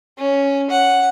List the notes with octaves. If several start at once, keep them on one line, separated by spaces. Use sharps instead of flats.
C#4
F#5